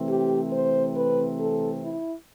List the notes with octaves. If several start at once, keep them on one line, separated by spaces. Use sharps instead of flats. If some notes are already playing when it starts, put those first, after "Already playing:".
Already playing: C3 E3 A3 C4
G4
C5
B4
A4
E4